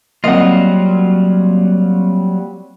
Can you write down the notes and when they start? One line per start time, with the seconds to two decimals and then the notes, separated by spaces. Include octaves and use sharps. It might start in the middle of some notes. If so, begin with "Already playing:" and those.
0.24 F#3 G3 A#3 C4 F4 D#5 F#5